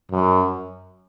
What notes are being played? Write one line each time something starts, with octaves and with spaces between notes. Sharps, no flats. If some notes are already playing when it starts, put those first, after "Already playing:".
F#2